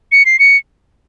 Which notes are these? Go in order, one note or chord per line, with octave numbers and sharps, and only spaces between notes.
C#7
C7
C#7